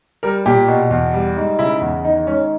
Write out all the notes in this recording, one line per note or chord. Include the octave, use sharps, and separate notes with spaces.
G3 A#4
A#2 G4
B2
E2
G3
G#2
C#3 E4
E2
D#3 D#4
G#2 C#4